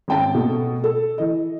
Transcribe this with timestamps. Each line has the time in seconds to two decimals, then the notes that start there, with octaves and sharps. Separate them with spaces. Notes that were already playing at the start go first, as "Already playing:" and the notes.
0.08 G#1 C#4 G5 A5
0.34 B2 A3
0.84 A4
1.18 E3 D#5